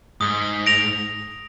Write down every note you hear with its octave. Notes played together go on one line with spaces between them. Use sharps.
G#2 D#6
A#6 D7 F7